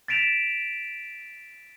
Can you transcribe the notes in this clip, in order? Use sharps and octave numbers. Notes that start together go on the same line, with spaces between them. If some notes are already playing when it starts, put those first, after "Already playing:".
A6 B6 D7 E7 F7